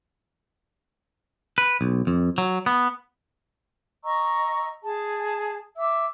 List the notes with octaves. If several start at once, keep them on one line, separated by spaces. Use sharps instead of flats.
B4
B1
F2
F#3
B3
D#5 A#5 C#6 E6
G#4 A5
E5 D6 E6